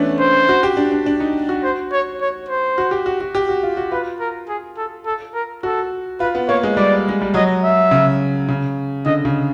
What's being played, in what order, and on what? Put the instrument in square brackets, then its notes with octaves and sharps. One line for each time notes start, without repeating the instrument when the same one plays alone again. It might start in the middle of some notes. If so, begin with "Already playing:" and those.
Already playing: [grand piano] E3 A3 B3 C#4 D4
[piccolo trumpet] C5
[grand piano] F#4
G4
D4
D4
D4
D#4
F#4
[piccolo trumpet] C5
C#5
C#5
C5
[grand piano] F#4
G4
F#4
F#4
G4
F#4
F4
F#4
[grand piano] F4 [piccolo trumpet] B4
[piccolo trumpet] A#4
G#4
A4
A4
A#4
[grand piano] F#4 [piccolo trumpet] A4
[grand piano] F4 [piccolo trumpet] B4
[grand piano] B3
[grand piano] A#3 [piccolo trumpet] C#5
[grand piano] G#3
[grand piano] G3 [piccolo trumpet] D5
[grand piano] G#3
G3
[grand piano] F#3 [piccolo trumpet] D#5
[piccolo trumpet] E5
[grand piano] C#3
C#3
[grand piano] D3 [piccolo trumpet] D#5
[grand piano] C#3